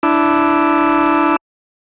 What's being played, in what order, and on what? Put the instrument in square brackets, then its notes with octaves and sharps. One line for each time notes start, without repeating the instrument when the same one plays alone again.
[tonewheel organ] D4 E4